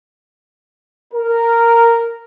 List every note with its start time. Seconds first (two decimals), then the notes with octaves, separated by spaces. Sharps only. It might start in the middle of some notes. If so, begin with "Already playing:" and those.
1.13 A#4